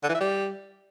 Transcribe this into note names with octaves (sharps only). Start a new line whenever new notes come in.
D3
E3
E4
G3